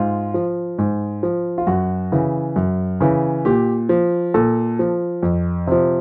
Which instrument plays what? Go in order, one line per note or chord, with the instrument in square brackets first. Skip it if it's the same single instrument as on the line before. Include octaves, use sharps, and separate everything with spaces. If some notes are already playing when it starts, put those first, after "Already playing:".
Already playing: [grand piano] G#2 F4
F3
G#2
F3
F4
F#2 F#4
C#3 E3
F#2
C#3 E3
A#2 G4
F3
A#2 A4
F3
F2
C3 F3